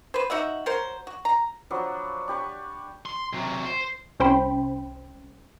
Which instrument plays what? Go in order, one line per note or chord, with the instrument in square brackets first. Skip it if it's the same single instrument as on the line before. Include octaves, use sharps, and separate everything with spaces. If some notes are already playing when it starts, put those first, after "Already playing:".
[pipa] B4 C5
D#4 F#4 E5 F#5
F#3 A#4 C5
F#4
A#5
[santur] F3 F#3 D4 B4
D4 G4 B4 C#6
[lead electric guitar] C6
C3 F#3
C5
[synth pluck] C2 C#4 C5 G5 B5